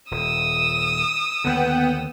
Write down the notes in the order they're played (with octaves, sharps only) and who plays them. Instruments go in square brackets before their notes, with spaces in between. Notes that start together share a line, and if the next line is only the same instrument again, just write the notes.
[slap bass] D#1 [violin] D#6 E6
[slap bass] D#2 D3 [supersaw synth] B3 F#5 G5